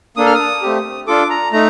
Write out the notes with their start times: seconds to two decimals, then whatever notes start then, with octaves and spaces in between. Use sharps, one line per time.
0.17 A#3 D4 A4 D#6
0.26 F6
0.34 D#6
0.62 A3 C4 G4
1.07 D4 F4 A4 D6
1.30 A#5
1.53 A3 D#4 A#5